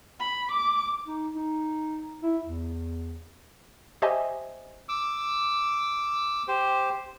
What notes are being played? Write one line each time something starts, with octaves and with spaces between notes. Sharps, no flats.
B5
D6
D#4
D#4
E4
E2
G4 C5 D#5 E5 G#5
D6 E6
G4 C5